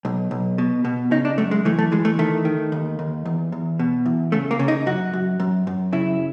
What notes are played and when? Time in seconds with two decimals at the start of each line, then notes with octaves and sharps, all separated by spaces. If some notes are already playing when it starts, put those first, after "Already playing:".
0.05 B1
0.31 B1
0.58 B2
0.85 B2
1.11 C#3 D#4
1.25 D4
1.38 F#2 A3
1.51 G#3
1.65 E3 A3
1.79 A3
1.92 E3 G#3
2.05 A3
2.19 D#3 A3
2.45 D#3
2.72 D#2
2.99 D#2
3.25 E2
3.52 E2
3.79 B2
4.06 E2
4.32 C#3 A3
4.51 A#3
4.59 C#3
4.68 D#4
4.86 F#2 F#4
5.13 F#2
5.40 F#2
5.67 F#2
5.93 C#3 E4